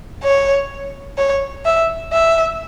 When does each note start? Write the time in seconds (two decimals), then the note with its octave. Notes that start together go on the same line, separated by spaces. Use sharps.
0.24 C#5
1.18 C#5
1.65 E5
2.13 E5